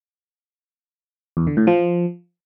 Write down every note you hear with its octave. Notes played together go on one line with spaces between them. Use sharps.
E2
D3
A2
F3